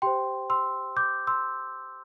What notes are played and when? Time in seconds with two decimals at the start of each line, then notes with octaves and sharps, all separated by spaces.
0.02 G4 C5 G5 C6
0.50 C6 E6
0.97 D6 G6
1.27 C6 E6